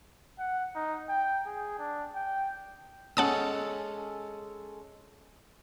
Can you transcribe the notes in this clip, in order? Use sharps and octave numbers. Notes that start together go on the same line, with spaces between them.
F#5
D#4
G5
G#4
D4
G5
G#3 C#4 A4 F#5 A5 D#6